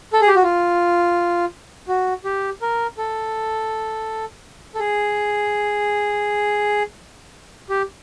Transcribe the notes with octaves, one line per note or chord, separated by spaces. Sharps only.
A4
G#4
G4
F#4
F4
F#4
G4
A#4
A4
A4
G#4
G4